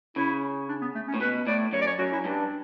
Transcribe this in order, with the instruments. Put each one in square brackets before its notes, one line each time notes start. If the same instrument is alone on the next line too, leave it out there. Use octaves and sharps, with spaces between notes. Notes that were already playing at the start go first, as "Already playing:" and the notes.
[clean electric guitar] C#3 [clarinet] E4
[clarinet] D4
B3
A3
C#4
[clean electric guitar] A2
[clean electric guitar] B2 [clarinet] B4
[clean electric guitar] A2 [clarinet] D5
[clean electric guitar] F#2 [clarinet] C#5
[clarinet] D5
C#5
[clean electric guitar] F#2 [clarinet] F#4
[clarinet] E4
[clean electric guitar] G2 [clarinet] D4